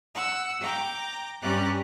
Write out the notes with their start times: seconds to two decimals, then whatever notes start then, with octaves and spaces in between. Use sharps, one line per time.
0.14 F#5 E6
0.61 G5 A#5 D6
1.41 G2 C#4 G4 D5 A#5 F#6